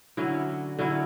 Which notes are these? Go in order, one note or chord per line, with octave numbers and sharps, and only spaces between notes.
D3 F#3 C#4 E4
D3 F#3 C#4 E4